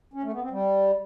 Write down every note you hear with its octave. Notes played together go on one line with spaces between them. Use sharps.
C#4
A3
B3
C4
G3